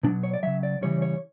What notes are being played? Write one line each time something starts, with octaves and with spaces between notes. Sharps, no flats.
B2 F#3 D4
C#5
D5
C#3 F#3 E5
D5
C#3 E3 G3 C#5
C#5